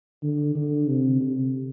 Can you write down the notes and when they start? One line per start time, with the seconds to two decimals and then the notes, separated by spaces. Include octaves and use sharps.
0.23 D3
0.55 D3
0.88 C3
1.21 C3